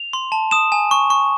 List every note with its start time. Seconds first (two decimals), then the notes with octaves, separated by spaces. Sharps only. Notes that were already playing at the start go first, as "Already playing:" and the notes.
Already playing: F7
0.13 C6
0.32 A5
0.51 D#6 E7
0.72 G#5
0.91 C#6
1.10 C#6